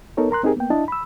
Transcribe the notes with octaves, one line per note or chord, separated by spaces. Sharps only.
B3 D#4 A4 A#4 C#5
A#4 A#5 C6 F#6
C4 D#4 G4 G#4 A#4
A#3 B3 G5
D4 E4 D#5 A5
B5 E6